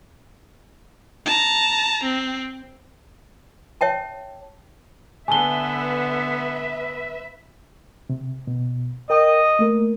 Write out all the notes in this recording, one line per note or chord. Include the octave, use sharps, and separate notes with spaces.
A5 A#5
C4
C#5 E5 G5 A5
D3 B3 B4 E5 G#5 A5 G7
C3
B2
A#4 D#5 G5
A3 A#3 A#4